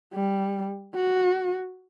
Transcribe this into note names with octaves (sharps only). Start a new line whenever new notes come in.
G3
F#4